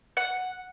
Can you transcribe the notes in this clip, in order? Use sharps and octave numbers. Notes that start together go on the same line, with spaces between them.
F#5